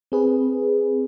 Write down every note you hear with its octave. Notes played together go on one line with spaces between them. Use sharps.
C4 G#4 B4